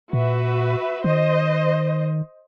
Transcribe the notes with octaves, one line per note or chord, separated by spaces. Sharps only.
A#2 F#4 B4 E5
D#3 C5 D#5